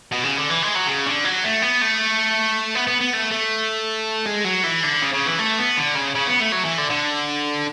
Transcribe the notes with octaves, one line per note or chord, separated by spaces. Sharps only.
B2
C#3
D3
E3
G#3
F#3
C#3
D3
F#3
A3
B3
A3
B3
B3
B3
A3
A3
G#3
F#3
E3
D3
C#3
C#3
E3
A3
B3
D3
C#3
C#3
B3
A3
F#3
E3
D3
D3